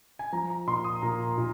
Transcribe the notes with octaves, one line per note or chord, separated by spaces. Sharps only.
G#5
F3 A#5
A#5
A#2 C6
D#6
A#2 A#5
A#2